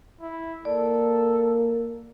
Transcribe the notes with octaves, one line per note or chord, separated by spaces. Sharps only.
E4
A#3 A4 D5